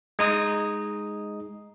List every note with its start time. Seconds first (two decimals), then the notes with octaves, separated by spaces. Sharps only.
0.19 G#3 D#4 D#6